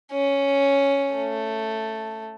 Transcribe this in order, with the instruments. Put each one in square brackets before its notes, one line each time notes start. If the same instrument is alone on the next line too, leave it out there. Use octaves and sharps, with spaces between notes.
[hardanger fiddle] C#4
A3